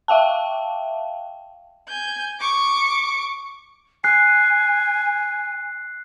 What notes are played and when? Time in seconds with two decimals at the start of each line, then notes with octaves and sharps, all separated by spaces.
0.08 E5 F5 G5 A5
1.87 G#5 G6
2.40 C#6 D6
4.04 G#5 F#6 C7